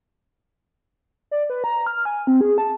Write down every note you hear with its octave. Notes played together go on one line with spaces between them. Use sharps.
D5
B4
A#5
F6
G#5
C4
G#4
A5